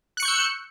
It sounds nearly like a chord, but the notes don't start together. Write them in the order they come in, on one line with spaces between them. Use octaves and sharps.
F#6 C#7 C#6 G6 E6